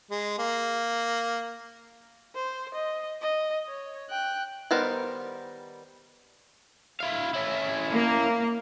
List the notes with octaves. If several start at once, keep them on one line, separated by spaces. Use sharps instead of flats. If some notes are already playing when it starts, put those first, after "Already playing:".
G#3
A#3
C5
D#5
D#5
C#5
G5 F#6
D#3 G3 B3 A#4 C5
E4 F5
C#4 E4
A#3